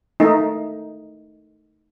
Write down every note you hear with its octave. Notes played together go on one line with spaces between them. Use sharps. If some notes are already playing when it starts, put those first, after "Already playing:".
A3 D#4